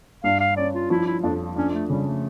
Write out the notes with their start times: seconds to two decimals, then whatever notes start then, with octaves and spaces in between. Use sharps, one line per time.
0.24 G2 F5
0.40 F5
0.57 C#4 D5
0.74 F4
0.90 F3 E4
1.07 E4
1.23 F2 D4
1.56 C#4 D4
1.74 A3
1.90 C#3 G3
2.07 A3